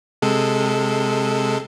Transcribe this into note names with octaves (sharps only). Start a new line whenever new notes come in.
C3 G#3 A4